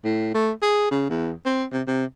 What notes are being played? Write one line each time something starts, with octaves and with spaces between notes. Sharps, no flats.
A2
A3
G#4
C#3
E2
C4
C3
C3